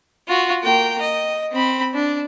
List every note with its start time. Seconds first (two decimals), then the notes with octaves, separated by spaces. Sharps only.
0.28 F4 F#4
0.63 A#3 G5
1.00 D#5
1.52 C4 B5
1.94 D4